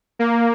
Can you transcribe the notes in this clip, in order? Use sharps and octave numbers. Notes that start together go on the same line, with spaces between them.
A#3